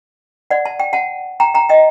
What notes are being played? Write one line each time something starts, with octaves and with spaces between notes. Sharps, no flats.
D5 F#5
A5
G5
F#5 A5
G5 A#5
G5 A#5
D#5 G5